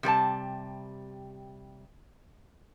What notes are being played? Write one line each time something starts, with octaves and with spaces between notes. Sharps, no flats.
C3 G3 B4 A5